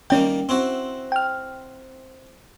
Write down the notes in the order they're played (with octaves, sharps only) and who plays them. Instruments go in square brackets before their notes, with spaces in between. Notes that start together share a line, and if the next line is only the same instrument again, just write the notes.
[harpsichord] D#3 G3 A#3 [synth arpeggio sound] C#4 G5
[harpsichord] C4 E4 F#4
[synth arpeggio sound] G5 F6